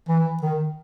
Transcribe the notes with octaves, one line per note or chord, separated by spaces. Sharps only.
E3
D#3